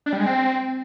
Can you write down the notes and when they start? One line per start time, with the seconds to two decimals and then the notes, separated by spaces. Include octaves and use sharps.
0.06 D4
0.13 G3
0.20 G#3
0.26 C4